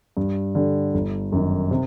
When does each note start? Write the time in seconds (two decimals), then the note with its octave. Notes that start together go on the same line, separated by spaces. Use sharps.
0.17 G2
0.55 D3 G3
0.94 G1
1.32 F#2 D#3
1.71 C3